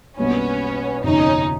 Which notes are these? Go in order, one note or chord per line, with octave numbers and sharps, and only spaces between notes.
B1 B2 G3 A#3 B3 C#4 D4
G1 F2 C3 C#4 D#4